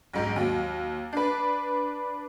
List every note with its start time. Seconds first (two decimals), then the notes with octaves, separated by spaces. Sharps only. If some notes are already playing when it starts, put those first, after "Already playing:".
0.13 B1 G#2
0.36 D#2 F#3
1.13 D4 B4